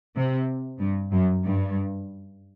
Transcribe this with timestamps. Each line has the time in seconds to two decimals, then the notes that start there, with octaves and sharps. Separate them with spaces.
0.15 C3
0.79 G2
1.11 F#2
1.43 G2